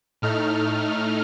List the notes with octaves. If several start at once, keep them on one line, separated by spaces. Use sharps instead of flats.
A2 A3 D#4 F6